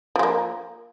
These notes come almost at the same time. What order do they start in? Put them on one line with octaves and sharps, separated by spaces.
F3 G#3 A#3